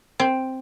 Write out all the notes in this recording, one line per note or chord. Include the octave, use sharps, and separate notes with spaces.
C4